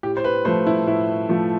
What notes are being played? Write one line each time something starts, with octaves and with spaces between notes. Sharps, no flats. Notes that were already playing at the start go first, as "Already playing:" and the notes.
A2 G4
C5
B4
F3 A3 C5
E4
A2 E4
F3 A3